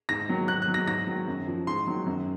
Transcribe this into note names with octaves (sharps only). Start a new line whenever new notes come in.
G#2 A#6
D#3 F#3
G#2 F#6
F#6
F#3
A#6
G#2 A#6
D#3 F#3
F#2
F3
G#2 C6
D#3 F#3
F#2